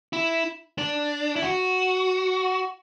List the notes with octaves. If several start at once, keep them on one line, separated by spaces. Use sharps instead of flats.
E4
D4
E4
F#4